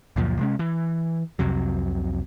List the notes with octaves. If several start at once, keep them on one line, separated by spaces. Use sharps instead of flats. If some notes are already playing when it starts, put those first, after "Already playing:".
C#2 F#2 A#2 F3
C3 G#3 C#4
E3
C2 F2 C3 F#3